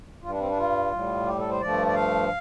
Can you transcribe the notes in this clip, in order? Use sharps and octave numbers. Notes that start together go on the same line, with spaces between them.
G2 G3 F4
D4
C4
D4
F4
A2 G3
G4
A4
C5
G2 F3 A3 D5
D5
F5